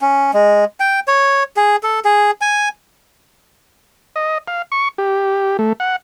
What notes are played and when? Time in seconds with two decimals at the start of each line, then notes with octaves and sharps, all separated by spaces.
0.01 C#4
0.34 G#3
0.80 G5
1.08 C#5
1.56 G#4
1.83 A4
2.05 G#4
2.41 G#5
4.16 D#5
4.48 F5
4.72 C#6
4.98 G4
5.59 A3
5.80 F#5